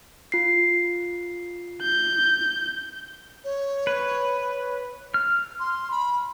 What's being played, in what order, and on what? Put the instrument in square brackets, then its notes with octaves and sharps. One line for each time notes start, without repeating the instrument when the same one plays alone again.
[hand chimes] F4 C7
[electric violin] G6
[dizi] C#5
[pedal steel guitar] B4
F6
[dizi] C6
B5